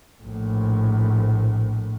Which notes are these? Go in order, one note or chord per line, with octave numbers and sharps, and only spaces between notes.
A#1 A2